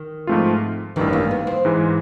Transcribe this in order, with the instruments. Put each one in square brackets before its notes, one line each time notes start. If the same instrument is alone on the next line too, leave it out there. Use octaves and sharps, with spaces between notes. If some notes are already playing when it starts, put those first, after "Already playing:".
Already playing: [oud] D#3
[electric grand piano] G#2 F3 A3 C4 F4
[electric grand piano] A1 G2 D#3 [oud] E3
[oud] A#3
B3
C4
[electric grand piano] G#2 E3 G#3